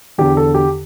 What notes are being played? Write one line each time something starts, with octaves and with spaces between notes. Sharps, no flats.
E2 D3 G4
A4
G4